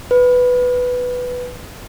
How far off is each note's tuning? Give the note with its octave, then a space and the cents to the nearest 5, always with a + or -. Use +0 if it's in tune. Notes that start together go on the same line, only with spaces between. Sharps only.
B4 +5